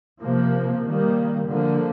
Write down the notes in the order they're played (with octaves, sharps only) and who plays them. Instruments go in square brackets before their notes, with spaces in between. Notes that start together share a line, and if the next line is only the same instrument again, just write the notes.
[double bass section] C3 F3 A#3
D#3 G3 A#3
D3 F3 A#3